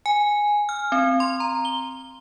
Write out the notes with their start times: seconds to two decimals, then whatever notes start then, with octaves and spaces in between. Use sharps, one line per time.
0.06 G#5
0.69 F6
0.92 C4
1.20 C6
1.40 A#5
1.65 G7